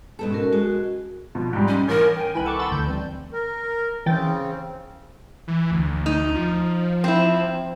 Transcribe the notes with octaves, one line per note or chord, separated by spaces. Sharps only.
G#2 B2 A4
C#4 F#4 A#4
G#3 F#4
B2 F3
G#2 G3
C#4
A1 A#4 A#6
G5 G#5
C2 D#3 E4 B4 G#5 B5
A4 F#5 A5 C#6 D6
A5 B5 C6 D6 E6 A6
A1 D2 D3 G6
E3 G3 C4
A#4
C#3 E3 C4 G5 A6
E3
D2
D#4
F3
C4 E4